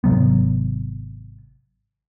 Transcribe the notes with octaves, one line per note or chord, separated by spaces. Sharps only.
G#1 C3 F#3 B3